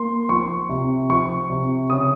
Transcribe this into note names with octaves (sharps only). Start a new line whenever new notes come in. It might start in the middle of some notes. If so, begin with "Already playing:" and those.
Already playing: A#3 C6
F3 C#6
C3
F3 C#6
C3
C#3 D#6